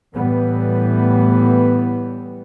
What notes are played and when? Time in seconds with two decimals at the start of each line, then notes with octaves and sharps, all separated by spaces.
0.14 A2 E3 G3 B3